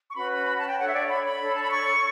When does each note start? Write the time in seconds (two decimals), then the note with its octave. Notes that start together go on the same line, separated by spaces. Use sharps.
0.09 C#6
0.15 C#4 F#4 B4 B5
0.31 B5
0.46 B5
0.57 A5
0.68 G5
0.77 D4 A4 C#5 F#5
0.87 E5
0.93 D5
1.08 B5
1.24 B5
1.40 D4 A4 C#5
1.54 A5
1.62 B5
1.70 C#6